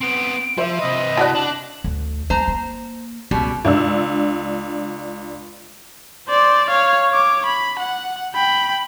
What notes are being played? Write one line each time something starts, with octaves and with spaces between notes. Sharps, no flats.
B3 C4 D7
F3 C5 E5
C3 B4 D#5
E4 F#4 D5 A5 F#6
D4 F#7
D2
A3 C5 A#5
A#3
C#2 B2 G3
C#2 D4 E6
C5 D5
C#5 F5
C#5 D6
B5
F#5
G5 B5